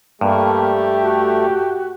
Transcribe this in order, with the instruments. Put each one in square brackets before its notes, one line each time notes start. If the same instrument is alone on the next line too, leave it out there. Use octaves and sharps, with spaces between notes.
[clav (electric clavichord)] G2 [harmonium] A3 [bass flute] A#3 [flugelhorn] G4
[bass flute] F#4